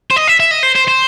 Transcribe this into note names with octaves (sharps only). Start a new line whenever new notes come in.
C5
D#5
E5
E5
D#5
C5
C5
C5